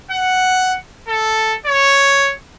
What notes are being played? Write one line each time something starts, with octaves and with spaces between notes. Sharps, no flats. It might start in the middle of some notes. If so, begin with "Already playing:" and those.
F#5
A4
C#5